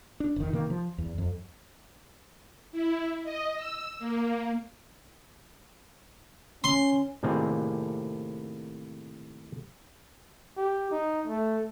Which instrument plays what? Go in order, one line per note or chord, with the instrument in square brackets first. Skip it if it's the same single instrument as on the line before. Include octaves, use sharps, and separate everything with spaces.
[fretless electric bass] D4
F1 D#3
C3 D#3 A#3
F3
E2
F2
[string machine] E4
D#5
E6
A#3
[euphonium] C#4 [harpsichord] C6
[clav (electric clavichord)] A2 C3 D#3 A#3 C4 G#4
[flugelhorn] G4
D#4
A3